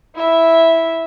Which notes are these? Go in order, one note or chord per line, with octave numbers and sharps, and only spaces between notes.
E4 E5